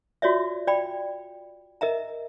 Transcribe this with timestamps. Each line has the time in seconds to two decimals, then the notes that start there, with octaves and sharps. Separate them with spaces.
0.22 F4 F#4 C#5 D5 E5
0.67 D5 G5 B5
1.81 A#4 D#5 E5 A#5